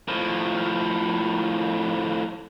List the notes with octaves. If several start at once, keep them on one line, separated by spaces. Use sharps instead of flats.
A2 F3